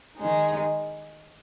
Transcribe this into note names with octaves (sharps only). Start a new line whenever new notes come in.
D#3 G#3 D#4